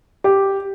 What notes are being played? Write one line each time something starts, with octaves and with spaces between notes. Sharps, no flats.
G4